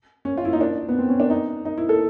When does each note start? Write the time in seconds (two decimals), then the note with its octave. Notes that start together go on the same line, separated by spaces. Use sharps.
0.25 C#4
0.38 F4
0.45 E4
0.53 D#4
0.61 D4
0.88 B3
0.99 C4
1.09 C#4
1.20 D4
1.30 D#4
1.65 D#4
1.78 E4
1.89 A4